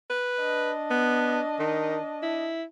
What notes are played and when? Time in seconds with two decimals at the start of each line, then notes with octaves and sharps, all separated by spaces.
0.10 B4
0.41 D4 D#5
0.91 B3
1.59 D#3
2.23 E4